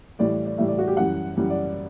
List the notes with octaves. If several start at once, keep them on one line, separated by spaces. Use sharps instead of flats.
A2 E3 G3 D5
D5
A2 E3 G3 E5
D5
F#4
G4
F#2 E3 G3 F#5
F#2 E3 G3
D5